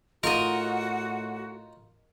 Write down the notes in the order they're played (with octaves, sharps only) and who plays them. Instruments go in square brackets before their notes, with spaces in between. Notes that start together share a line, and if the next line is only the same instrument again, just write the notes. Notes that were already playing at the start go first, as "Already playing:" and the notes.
[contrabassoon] A2 [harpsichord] D#4 F4 C#6 [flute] F#4 [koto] A#4 D#5